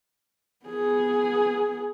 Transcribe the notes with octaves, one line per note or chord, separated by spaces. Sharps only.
B3 G#4